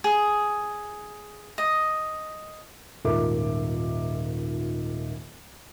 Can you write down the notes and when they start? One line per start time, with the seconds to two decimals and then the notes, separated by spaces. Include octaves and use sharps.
0.04 G#4
1.58 D#5
3.04 D#1 G#2 F4 A#4 E5 D6